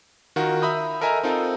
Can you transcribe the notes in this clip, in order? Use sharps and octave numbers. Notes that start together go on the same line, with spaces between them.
D#3 F4 F#4 A#4
E5 A#5 B5 D#6 G6
A4 A#4 D#5 E5 G#5 A#5
C4 D#4 F4 A4 A#4